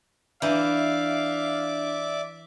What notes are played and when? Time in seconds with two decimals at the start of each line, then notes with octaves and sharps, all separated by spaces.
0.42 E3 D4 D5 E5 F5 D6 G6